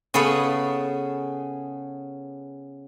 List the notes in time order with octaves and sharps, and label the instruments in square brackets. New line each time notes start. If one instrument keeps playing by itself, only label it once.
[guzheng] C#3 B3 G#4 A4 C#5 B5